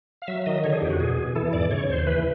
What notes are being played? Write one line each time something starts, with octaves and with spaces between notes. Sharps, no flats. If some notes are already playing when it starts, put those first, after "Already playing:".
F5
F#3 E5
D#3 D#5
D3 C#5
G#4
F2 G4
F#4
B2 G#4
E2
E3 A4
G#2 D5
C#3 C#5
D#2 C5
E3 B4